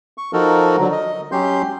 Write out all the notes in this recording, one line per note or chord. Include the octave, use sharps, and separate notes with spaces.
C#6
F3 D#4 F#4 A4 A#4
D3 F#3
D#5
F#3 C#4 G4 C6 G6